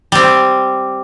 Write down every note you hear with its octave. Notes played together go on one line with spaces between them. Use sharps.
G3 C4